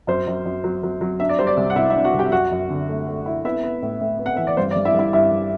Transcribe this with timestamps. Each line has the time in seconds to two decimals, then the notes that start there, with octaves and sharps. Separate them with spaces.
0.07 F#2 C5
0.27 F#2
0.45 F#2
0.64 F#3
0.83 F#3
1.01 F#3
1.20 D4 E5
1.29 D5
1.39 G3 C5
1.47 D5
1.57 C2
1.70 F#5
1.76 C3 E4 E5
1.90 E4 E5
1.96 D4
2.04 F#4 F#5
2.14 C2
2.19 G4 G5
2.32 F#2 F#4 F#5
2.52 F#2
2.70 D3
2.89 A3
3.08 A3
3.26 E4
3.45 B3 E4 E5
3.64 B3
3.82 A2
4.01 A2
4.19 B3
4.26 F#5
4.37 E3 E5
4.47 D5
4.57 G2 C5
4.71 D5
4.76 G2
4.85 E4 E5
4.94 G2
4.99 E4 E5
5.13 G2 E4 E5
5.32 G2